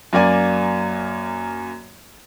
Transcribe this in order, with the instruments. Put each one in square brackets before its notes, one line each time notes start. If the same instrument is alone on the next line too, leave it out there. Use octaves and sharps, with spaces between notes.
[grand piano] F#2 A#3 D5 G#5